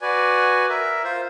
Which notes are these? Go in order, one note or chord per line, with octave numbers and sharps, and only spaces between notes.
F#4 B4 D5 G#5
A#4 E5
F4 C5